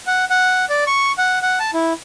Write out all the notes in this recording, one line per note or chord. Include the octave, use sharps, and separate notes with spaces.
F#5
F#5
D5
C#6
F#5
F#5
A5
E4